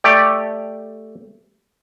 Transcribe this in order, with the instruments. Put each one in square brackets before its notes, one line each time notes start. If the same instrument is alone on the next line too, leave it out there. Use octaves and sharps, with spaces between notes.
[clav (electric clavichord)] A3 G4 D5